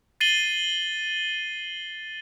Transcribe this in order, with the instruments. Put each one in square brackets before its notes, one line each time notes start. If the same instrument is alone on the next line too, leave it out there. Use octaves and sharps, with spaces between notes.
[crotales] A6 C7 D#7 F#7 G7